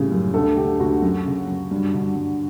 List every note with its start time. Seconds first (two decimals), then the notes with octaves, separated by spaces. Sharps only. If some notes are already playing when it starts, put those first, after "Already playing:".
Already playing: A2 C#3 G3
0.12 F#2
0.34 D2 A4
0.56 D3 G4
0.79 D2 F#4
1.02 F#2
1.26 C#3
1.47 F#2
1.71 G2
1.94 D3
2.16 G2